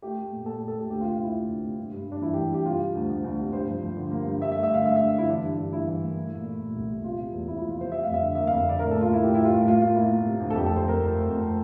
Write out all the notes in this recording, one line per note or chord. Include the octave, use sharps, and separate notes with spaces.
A3 G4
A3
A#2
A#2 A4
A3
A4
A#2 G4
D2 G4
F4
C3
F4
D2 E4
D2
D2
C3
G2
G2
G2 D4
E3 E4
E3 G4
G2 G4
C3 F4
G3
D2
D2
D2
C3
G2 C5
F3
F3
D3
A#3
G2
G2 E5
E5
A3
E5
D3 F5
G2 E5
G2 E5
D3 E4
E3 D4
G2
G2
G2 E4
E3
A#3
A3
A#2
A3
A#2
C2
A#2
C3 F4
C3
E2
C3 E4
F3 E4
F4
C3 C5
G3 E5
F2 F5
E5
D3
A#3 E5
F2 F5
E5
D3 D5
A2 A#4
A#3 A4
F4
A#3 E4
A2 G4
G3 E4
F4
A2
A#3 F4
A#3 F4
A#3 E4
A#3
C3
D2
A4
F2 G4
F3 A4
C5
F2 A#4
F3
A3
F2